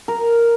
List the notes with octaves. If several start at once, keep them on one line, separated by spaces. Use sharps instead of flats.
A#4